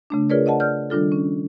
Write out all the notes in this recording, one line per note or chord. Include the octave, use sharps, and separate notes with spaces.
C#3 A3 D4
F4 G#4 A#4 B4 C#5 D5
D5 D#5 F#5 A5
D5 F6 G6
D#3 G3 D4 F4 A4
C#4